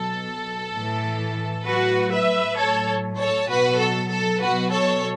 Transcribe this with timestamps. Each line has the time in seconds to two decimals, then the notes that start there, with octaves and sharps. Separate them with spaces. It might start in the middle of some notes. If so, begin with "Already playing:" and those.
Already playing: B2 F#3 A4
0.73 A2 E3
1.65 A2 F#3 F#4 B4
2.12 B4 E5
2.56 A2 F#3 A4 C#5
3.18 A4 C#5
3.49 B2 F#3 F#4 B4
3.79 A4
4.10 A4
4.41 B2 F#3 F#4 B4
4.71 A4 C#5